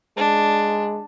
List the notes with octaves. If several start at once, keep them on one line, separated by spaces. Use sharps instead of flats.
G#3 D4